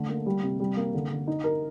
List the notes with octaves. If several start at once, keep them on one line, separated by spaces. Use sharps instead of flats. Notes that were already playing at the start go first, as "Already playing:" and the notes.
Already playing: D3 A3
A#3
G3
C3
G3
A#3
D3
D3
D#4
A#4